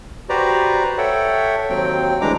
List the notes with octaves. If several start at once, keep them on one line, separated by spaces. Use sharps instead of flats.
F#4 G4 B4 C5 D5 A#5
A4 C#5 E5 F#5 G5
D#2 F#3 C4 G5
D2 E3 G#3 D4 A#5 D6